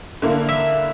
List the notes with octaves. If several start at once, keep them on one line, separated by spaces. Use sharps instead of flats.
D3 A#3 E4
E5